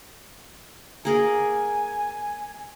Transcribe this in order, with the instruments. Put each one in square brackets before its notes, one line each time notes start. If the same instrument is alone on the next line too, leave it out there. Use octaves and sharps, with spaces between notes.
[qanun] A#3 G#4 A#4 [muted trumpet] G#5